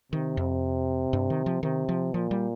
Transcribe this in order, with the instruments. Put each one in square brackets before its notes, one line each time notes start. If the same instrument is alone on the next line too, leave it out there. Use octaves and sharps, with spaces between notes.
[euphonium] C3 [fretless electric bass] D#3
[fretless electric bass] F2
G2
D#3
F3
[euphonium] C3 [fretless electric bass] D#3
[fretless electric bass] F3
[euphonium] A#2 [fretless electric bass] F3
[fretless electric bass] G3